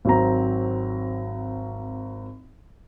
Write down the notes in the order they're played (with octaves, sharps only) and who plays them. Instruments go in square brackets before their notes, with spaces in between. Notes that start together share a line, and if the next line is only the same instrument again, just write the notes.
[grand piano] G#1 F#3 C4 A#5